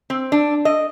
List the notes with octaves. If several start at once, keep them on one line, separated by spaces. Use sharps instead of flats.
C4
D4
D#5